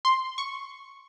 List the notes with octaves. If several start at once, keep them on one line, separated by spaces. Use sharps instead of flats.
C6
C#6